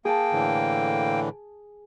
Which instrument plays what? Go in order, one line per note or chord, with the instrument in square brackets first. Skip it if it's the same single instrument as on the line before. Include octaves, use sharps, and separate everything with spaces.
[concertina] A#3 G5 [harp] G#4 A5
[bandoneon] A2 D3 E3